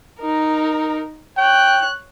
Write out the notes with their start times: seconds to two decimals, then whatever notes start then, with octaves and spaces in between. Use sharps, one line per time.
0.19 D#4 A#4
1.37 C#5 G5 F#6